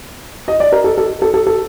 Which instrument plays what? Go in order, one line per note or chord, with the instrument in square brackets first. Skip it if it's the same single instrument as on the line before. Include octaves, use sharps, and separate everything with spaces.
[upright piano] D#5
D5
A#4
A4
A4
A4
A4
A4